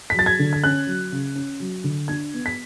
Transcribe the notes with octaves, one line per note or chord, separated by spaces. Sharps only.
B6
F#3 A6
G#6
D3
G#6
C#4 F#6
F#3
C#3
C#4
F#3
D3
D4 G#6
B3
B6